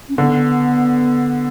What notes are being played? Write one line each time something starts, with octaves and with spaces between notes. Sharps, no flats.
C#4
D3 B3